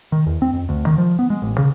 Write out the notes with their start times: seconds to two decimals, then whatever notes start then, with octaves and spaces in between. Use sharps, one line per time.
0.12 D#3
0.26 E2
0.42 C4
0.53 F2
0.69 D2
0.87 D#3
0.98 F3
1.19 B3
1.30 G#3
1.42 A1
1.58 C#3